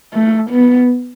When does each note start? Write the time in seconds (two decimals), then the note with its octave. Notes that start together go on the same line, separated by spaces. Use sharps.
0.14 A3
0.50 B3